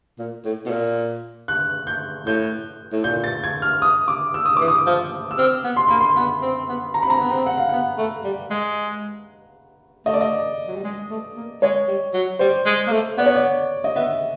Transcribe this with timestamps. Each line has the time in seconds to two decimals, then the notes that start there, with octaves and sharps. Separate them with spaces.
0.18 A#2
0.44 A2
0.66 B2
0.70 A#2
1.48 F#6
1.87 G6
2.26 A2 G6
2.92 A2
3.04 A#2 G6
3.24 A6
3.44 G#6
3.62 F6
3.82 D#6
4.08 D6
4.34 E6
4.46 D#6
4.57 E3 D6
4.68 D#6
4.86 F3
5.31 E6
5.38 C4 F6
5.64 B3
5.77 C6
5.89 A#3 B5
6.00 C6
6.16 B3 B5
6.42 C4
6.68 B3
6.94 A#5
7.03 B5
7.06 C4 A#5
7.19 B3
7.32 C4
7.46 F#5
7.58 F5
7.69 B3 F#5
7.98 A3
8.24 G3
8.50 G#3
10.06 A3 D#5
10.14 D5
10.21 D#5
10.67 F#3
10.76 G3
10.84 G#3
11.10 A3
11.36 A#3
11.62 G#3 C#5
11.88 G3
12.14 F#3
12.39 G3 C5
12.66 G#3
12.87 A#3
12.92 A3
13.18 B3 D5
13.26 C#5
13.35 D5
13.84 D#5
13.96 B3 E5